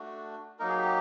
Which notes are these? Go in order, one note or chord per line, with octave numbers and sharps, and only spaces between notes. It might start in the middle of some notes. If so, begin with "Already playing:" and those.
Already playing: A3 D4 F#4
F#3 A#3 D#4 A#4
G#4
G4